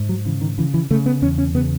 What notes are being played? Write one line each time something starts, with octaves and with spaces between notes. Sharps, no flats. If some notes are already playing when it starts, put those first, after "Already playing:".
Already playing: G#2
F#3
C#3 E3
D#3
C#3 E3
E3
C#3 A3
B3
E2 C#4
C#4
C#3 B3